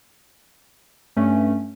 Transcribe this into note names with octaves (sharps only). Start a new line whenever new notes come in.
G2 A3 C#4